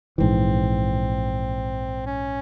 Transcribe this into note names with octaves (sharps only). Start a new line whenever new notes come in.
A#1 G#2 E3 C4
C#4